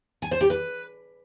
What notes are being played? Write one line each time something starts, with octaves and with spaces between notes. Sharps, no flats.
G#5
C5
G4
B4